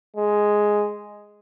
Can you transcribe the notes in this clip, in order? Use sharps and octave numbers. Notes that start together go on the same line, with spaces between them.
G#3